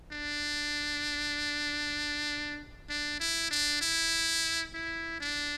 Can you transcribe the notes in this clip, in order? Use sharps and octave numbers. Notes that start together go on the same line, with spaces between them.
D4
D4
E4
D4
E4
E4
D4